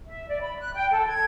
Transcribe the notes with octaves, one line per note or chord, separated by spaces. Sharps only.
E5
D5
B5
F#6
G5
A4
G#6